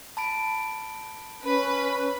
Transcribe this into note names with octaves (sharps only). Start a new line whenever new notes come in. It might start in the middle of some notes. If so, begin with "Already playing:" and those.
A5 B5 D7
C#4 B4